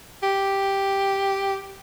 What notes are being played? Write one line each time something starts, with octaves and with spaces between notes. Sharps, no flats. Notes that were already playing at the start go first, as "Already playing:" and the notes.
G4